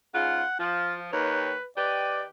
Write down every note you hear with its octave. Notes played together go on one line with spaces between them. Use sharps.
G#2 C#3 F4 F#5
F3 F4
D#2 B4 C#5
D#3 G4 B4 D5